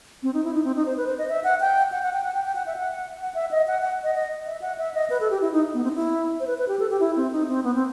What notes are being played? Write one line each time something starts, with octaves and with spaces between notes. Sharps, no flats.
C4
D#4
E4
D#4
C4
D#4
C5
B4
C5
D#5
E5
F#5
G5
F#5
F#5
G5
F#5
G5
G5
F#5
E5
F#5
F#5
E5
D#5
F#5
F#5
D#5
D#5
E5
F#5
E5
D#5
B4
A4
G4
E4
D#4
B3
C4
D#4
E4
C5
B4
B4
G4
A4
G4
E4
C4
D#4
C4
B3
C4